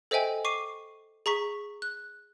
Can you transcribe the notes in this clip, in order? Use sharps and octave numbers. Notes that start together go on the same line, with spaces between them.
A4 C5 D#5 E5 G5 G#5
C#6 D6 C7 D#7
G#4 A#5 C#6 B6
F#6